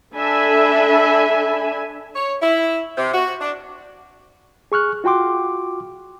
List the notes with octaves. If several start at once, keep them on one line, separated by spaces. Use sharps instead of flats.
D4 A4 E5 G#5 B5
C#5
E4
C3
F#4
D4
G#4 C#6 F6 F#6
F4 F#4 G5 C6 D6